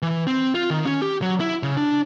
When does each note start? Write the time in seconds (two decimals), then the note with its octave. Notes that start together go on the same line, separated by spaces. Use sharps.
0.02 E3
0.27 C4
0.55 F4
0.70 D#3
0.85 C#4
1.02 G4
1.22 F#3
1.40 E4
1.63 C#3
1.77 D4